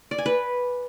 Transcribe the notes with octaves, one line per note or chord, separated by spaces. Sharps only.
D5
G#5
B4